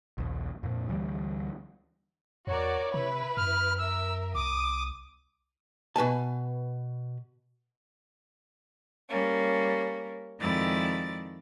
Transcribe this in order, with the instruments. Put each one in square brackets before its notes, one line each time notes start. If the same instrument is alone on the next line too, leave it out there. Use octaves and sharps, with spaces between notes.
[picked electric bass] A#1 D#2
F2 A#2
D2 E3 F3 G3
[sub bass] E2 [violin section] F#4 A#4 D5 [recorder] C#5
[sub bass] C3 [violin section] E4 B4 B5
[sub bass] F#2 [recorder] F6
[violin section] A#4 E5 [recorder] E6
[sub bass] C2 [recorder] D6 [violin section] D#6
[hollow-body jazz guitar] B2 B4 G#5 A5
[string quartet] G3 A#3 C#4
F2 D#3 G#3 E4 D5 A6